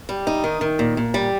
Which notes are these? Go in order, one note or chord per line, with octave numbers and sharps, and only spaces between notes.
G3
D#4
D#3
D#3
A#2
A#2
G3